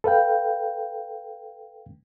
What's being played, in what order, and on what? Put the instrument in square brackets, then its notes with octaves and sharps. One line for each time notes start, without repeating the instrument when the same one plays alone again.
[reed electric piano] A4 B4 F5 G5